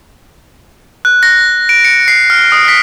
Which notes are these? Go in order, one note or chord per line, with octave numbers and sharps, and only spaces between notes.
F#6
A#6
D7
C#7
C7
F6
D#6
B6